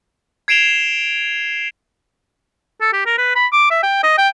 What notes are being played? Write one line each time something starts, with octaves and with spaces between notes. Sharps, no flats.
G#6 C7 D7 E7 F7 G7
A4
G4
A#4
B4
B5
D6
E5
G5
D#5
G5